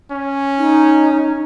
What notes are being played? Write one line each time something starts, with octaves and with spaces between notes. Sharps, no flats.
C#4
D#4